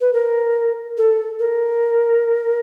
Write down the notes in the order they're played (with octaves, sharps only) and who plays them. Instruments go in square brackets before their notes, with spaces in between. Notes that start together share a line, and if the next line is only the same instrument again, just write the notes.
[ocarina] B4
A#4
A4
A#4